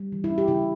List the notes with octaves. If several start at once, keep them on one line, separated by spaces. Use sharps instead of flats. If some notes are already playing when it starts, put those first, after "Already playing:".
Already playing: G3
E3
E4
C#4
G4
C#3 E4